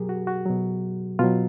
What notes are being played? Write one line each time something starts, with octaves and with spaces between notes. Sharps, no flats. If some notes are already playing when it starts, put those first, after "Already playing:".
Already playing: B2 F#3 G4 G#4 A#4
F#4
F#4
B2 F#3
B2 F#3 F4